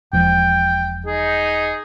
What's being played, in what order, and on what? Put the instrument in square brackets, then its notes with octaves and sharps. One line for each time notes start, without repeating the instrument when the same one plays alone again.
[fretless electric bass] E1 F3 [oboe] G5
[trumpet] D#4 [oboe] G#4